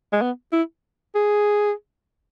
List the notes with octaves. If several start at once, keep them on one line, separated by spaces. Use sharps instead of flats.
G#3
B3
E4
G#4